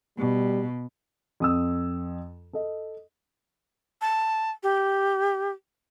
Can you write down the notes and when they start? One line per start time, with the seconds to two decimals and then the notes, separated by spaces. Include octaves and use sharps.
0.18 B2 G3
1.40 F2 D#6 E6
2.53 A4 D#5
4.02 A5
4.63 G4